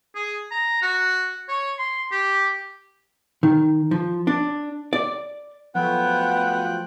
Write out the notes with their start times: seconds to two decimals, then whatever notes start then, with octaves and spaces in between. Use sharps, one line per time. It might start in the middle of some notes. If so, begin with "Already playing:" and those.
0.15 G#4
0.51 A#5
0.82 F#4
1.48 C#5
1.79 C6
2.12 G4
3.43 D#3
3.91 F3
4.27 D4
4.93 D5
5.75 F3 F#3 A3 B3 F4 G5 F#6